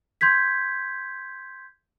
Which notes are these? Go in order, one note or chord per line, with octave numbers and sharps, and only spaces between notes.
C6 G6 G#6 B6